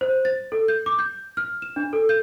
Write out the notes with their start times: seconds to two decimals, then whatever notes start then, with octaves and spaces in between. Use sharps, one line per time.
0.01 C5
0.25 A6
0.52 A4
0.68 G6
0.86 D6
0.99 G6
1.37 F6
1.62 E7
1.76 D4
1.93 A4
2.09 G6